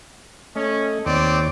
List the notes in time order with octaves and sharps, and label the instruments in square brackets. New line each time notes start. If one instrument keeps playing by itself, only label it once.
[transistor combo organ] A3 D#5 [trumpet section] C#4
[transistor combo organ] D#2 C#5 D6 [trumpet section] C4 D5